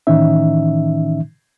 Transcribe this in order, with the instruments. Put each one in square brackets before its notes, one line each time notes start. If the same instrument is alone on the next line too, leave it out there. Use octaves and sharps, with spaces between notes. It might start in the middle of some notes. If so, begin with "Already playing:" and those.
[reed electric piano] A2 D#3 E3 C#4 D#4 E5